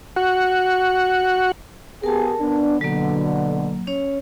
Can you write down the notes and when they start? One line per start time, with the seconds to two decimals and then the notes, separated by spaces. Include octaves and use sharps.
0.16 F#4 F#5
2.03 B3 G4 G#4 A#4 A5
2.41 B3 D4
2.81 B2 D3 F#3 A#3
3.87 C#4 C#5